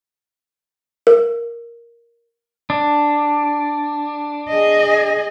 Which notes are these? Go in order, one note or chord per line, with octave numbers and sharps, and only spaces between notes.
A#4
D4
G#4 D#5